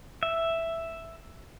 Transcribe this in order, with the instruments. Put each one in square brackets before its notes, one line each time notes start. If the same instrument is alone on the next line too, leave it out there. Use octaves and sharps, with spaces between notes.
[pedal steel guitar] E5